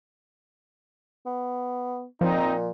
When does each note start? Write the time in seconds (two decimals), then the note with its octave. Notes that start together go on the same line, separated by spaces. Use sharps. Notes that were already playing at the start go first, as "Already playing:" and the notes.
1.26 B3
2.21 A#2 F3 C4 D#4